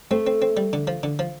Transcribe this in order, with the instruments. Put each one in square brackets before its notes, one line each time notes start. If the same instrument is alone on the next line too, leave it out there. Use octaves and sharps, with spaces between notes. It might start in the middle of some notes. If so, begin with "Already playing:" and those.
[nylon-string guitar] A3 [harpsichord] C4
[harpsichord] C4
C4
G3
D3
F3
D3
F3